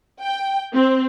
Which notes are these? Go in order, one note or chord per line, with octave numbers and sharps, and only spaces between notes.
G5
C4